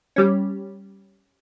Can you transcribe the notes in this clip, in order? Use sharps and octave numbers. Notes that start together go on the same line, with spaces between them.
G3 C#4